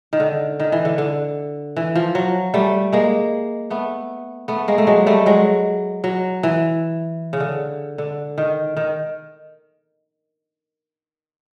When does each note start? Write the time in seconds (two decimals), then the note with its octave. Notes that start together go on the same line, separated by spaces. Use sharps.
0.13 D#3
0.20 D3
0.60 D#3
0.72 E3
0.85 D3
0.98 D3
1.77 E3
1.96 F3
2.15 F#3
2.54 G3 A3
2.93 G#3 A#3
3.70 A3 B3
4.48 A3 B3
4.68 G#3 A#3
4.78 A3
4.87 F#3 G#3
5.06 G3 A3
5.26 F#3 G#3
6.04 F#3
6.43 E3
7.33 C#3
7.40 D3
7.98 D3
8.38 D#3
8.77 D#3